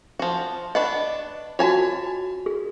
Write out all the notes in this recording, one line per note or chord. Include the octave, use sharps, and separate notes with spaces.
F3 F#4
D4 B4 D#5 F#5 G5 C#6
F4 F#4 C#5 G#5 A5
G#4